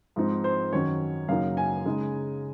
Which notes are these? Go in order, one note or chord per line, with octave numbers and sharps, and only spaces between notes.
G#2 F3 C4 D#4
C5
F#2 D#3 F#3 C#4 C#5
F#2 C#3 F#3 A#3 D#4 F5
G#5
C#3 G#3 D#4